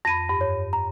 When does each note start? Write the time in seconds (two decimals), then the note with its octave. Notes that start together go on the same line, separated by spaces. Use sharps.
0.05 F2 B5 A#6 D#7
0.29 G2
0.41 C#5
0.73 A#5